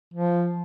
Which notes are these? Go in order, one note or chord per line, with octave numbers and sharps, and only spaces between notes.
F3